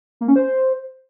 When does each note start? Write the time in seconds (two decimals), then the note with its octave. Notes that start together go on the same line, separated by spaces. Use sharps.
0.21 A#3
0.28 C#4
0.36 C5